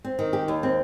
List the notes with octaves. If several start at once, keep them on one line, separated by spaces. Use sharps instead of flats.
C4
D#3
G4
D#2
C4